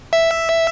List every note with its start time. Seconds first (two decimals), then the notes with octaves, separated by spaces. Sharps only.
0.13 E5